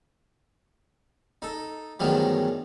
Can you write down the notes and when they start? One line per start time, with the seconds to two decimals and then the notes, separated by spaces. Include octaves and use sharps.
1.42 D#4 A4
2.00 E2 G2 D#3 F3 F#3 A3